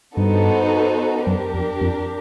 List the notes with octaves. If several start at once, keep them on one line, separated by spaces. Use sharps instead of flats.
G2 B3 D#4 F#4 A4 C5
F#2 D4 G4 A#4
F2
F2